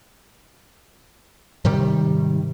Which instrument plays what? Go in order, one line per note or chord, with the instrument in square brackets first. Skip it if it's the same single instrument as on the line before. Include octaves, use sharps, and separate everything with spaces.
[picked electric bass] G#2 C3 D#3 G3